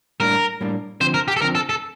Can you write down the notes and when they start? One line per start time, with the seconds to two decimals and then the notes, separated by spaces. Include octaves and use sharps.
0.20 A2 G3 A#3 D4 A#4
0.61 A2 G3 A#3 D4
1.00 D3 F3 C4 C5
1.14 A#4
1.28 G4
1.36 A4
1.42 D3 F3 C4 A#4
1.55 A4
1.69 A4